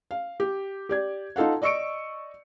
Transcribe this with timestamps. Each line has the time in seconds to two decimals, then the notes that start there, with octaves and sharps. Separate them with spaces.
0.11 F5
0.40 G4
0.89 G4 D5 G#6
1.36 D#4 F4 A4 F5 F#5
1.62 D5 D#5 C#6 E6 C#7 D7